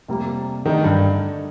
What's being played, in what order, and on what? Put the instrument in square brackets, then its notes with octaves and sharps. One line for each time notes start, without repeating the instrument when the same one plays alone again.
[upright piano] F2 C3 G3 A#3
[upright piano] D3 A3 D#4 [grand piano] D#3
[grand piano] G2